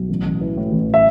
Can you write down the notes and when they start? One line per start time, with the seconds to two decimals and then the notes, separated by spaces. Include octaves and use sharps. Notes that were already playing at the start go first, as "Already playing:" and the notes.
Already playing: B1
0.09 A1
0.25 A1
0.41 E3
0.57 A2
0.72 A1
0.94 E5